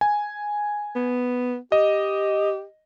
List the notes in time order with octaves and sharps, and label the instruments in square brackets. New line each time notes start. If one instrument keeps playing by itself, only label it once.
[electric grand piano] G#5
[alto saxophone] B3
[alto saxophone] G4 [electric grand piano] D#5